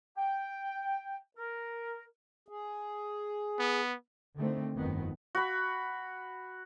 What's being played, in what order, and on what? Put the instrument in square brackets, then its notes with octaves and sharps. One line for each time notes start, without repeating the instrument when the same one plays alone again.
[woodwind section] G5
A#4
[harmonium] G#4
[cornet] B3
[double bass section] D3 D#3 A3 C4
G1 F2 D#3 B3
[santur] F#4 B5